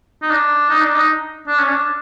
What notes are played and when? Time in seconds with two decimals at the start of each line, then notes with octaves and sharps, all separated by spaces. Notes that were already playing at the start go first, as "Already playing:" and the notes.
0.22 D#4
0.31 D4
0.70 D#4
0.82 D4
0.95 D#4
1.48 D4
1.59 C#4
1.68 D4